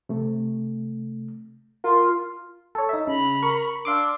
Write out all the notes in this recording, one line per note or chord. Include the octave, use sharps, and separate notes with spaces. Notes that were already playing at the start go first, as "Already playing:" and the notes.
C3 A3
F4 A#4
A4 C#5
D#4 E5
C#3 A#5 B5
A#4 C#6
D4 F5 C6 D6 E6